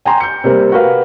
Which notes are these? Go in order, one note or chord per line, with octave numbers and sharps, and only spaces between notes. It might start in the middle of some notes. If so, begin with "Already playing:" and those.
G5 G#5 A#5 C6
G6 C#7
C3 G3 A#3 C4
F#4 G4 A#4 B4 F5